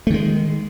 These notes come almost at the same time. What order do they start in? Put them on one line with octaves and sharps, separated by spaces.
A3 D#3 G#3